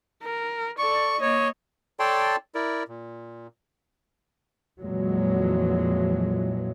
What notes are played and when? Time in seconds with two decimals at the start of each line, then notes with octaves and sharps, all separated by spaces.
0.23 A#4
0.78 A4 D5 C#6
1.21 A#3 C#5 D#5
2.00 A4 C#5 D5 G5 A5 C6
2.55 E4 A#4 D5
2.88 A#2
4.81 F2 A#2 E3 F#3 G#3